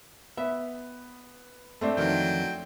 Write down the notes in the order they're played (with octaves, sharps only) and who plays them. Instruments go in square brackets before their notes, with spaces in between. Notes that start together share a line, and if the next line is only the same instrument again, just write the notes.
[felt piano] B3 [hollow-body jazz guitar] E5
[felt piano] A3 C4 D4
[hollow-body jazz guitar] F2 D#3 E3 [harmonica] F#3 G5